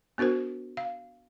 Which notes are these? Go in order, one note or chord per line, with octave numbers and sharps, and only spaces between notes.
B3 D4 F#4 A#4 C5
F5